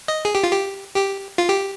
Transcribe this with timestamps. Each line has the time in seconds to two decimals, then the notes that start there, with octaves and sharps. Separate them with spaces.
0.08 D#5
0.25 G#4
0.35 G4
0.44 F4
0.52 G4
0.96 G4
1.38 F4
1.49 G4